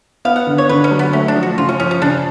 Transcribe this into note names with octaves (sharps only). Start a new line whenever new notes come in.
B3 F5
F#5
D3
C#5
D3 B4
C#4
F#3
B3
A3 C#4
D4
F3
F#4
C#3 F4
C#4
F3 C#4
C#4
C#3 D4